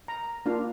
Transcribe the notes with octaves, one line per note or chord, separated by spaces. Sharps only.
A#5
A#3 D4 F4 F5